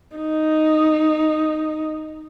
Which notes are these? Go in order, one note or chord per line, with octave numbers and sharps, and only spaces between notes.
D#4